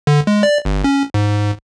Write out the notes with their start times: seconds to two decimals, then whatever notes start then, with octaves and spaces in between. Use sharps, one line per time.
0.07 D3
0.27 G#3
0.43 D5
0.65 G1
0.84 C#4
1.14 G#2